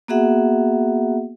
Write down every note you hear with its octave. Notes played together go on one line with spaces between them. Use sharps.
A#3 B3 F#4 G#4 E5 F#5